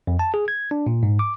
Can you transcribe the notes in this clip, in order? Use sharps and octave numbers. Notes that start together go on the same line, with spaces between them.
F2
A5
G#4
G#6
D4
A#2
G#2
D6